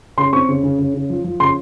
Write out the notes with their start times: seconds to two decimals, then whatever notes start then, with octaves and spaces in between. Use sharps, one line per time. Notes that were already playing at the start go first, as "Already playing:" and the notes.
0.17 C#3 C6
0.33 C4 C#6
0.49 C#3
0.63 C#3
0.79 C#3
0.94 C#3
1.10 F3
1.24 F3
1.40 C#3 C6